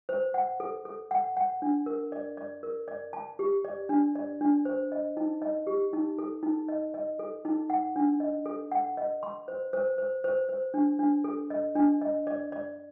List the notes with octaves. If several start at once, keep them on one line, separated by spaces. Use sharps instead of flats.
C5
F#5
A4
A4
F#5
F#5
D4
A#4
D5
D5
A#4
D5
A5
G4
D5
D4
D5
D4
C5
D#5
D#4
D#5
G4
D#4
A4
D#4
D#5
D#5
A4
D#4
F#5
D4
D#5
A4
F#5
D#5
C6
C5
C5
C5
C5
C5
D4
D4
A4
D#5
D4
D#5
D5
D5